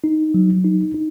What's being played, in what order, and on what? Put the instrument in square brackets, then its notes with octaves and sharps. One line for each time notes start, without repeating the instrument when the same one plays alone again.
[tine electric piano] D#4
F#3
D#4
D#4